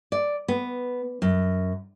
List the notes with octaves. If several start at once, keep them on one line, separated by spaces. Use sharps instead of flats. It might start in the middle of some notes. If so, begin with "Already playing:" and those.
D5
B3
F#2